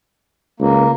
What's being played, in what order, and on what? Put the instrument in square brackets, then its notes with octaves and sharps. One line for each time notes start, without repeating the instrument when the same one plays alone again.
[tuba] C#2 [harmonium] A#3